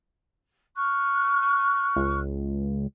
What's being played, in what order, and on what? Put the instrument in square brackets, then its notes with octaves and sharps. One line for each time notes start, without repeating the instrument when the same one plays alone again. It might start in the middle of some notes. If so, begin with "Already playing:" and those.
[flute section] C#6 F6 F#6
[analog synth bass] C#2